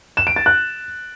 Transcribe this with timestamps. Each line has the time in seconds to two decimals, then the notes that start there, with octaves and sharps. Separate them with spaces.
0.17 E7
0.27 D7
0.36 A6
0.46 F#6